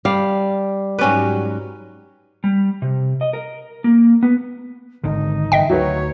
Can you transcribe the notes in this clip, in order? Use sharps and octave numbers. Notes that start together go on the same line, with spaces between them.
G3 F5
G#2 F#3 C#4 G4 B4
G3
C3
D#5
A#4
A#3
B3
G#1 D3 D#3 D#4
G1 D3 E3 D#5 E5 G5
D2 F#3 D#4 B4 C#5